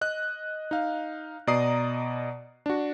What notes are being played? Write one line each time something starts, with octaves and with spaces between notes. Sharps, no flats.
D#5 F#6
D#4 F5
B2 D5 D#5 A#5 D#6 C7
D4 F#4